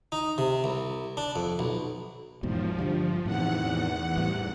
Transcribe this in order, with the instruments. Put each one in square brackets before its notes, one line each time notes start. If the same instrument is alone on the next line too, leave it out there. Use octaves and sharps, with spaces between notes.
[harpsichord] D#4
C3
C2
D4
F2
B1
[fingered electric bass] E2 G#2 B2 [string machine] F3
[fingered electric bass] G2 D3 G3
[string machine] E2 F#5 [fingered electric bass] A2 C3 D#3
[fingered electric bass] A2 G3